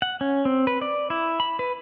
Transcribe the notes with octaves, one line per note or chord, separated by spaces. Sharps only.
F#5
C#4
C4
B4
D5
E4
B5
B4